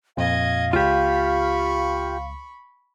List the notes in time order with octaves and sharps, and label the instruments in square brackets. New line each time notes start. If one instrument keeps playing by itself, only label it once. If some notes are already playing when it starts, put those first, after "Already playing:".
[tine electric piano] F2 A#2 [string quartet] D#5 G#6 [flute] F5
[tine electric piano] C#2 [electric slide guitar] F4 G4 [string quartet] B5 C#6